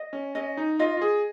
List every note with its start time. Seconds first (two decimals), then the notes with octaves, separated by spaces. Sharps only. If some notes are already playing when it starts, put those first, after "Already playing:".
Already playing: D#5
0.13 C#4
0.35 C#4 D#5
0.57 D#4
0.79 F4 D#5
0.97 F4
1.01 G#4